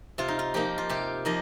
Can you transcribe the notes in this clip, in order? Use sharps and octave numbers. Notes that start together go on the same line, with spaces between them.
C3 F4
D#4
F4
F3 A#3 D#4 G4
F4
C3 G4
F3 A#3 D#4 D#5